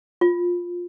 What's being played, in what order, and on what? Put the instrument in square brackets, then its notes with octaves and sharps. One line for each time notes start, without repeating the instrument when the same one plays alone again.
[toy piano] F4